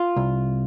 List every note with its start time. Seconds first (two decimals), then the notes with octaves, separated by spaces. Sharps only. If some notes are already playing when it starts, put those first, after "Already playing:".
Already playing: F4
0.16 C2